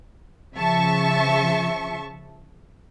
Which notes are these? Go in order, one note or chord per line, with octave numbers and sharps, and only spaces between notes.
C#3 F3 E5 A5 C#6